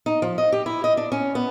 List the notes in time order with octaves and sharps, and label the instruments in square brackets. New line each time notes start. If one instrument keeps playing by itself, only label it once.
[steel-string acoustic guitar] D#4
F3
D#5
G4
E4
D#5
D4
C#4
B3